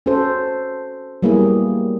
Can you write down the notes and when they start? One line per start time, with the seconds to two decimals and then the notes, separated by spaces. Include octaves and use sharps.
0.06 C#4 F#4 A4 C5
1.22 F#3 G3 A#3 B3 E4 G#4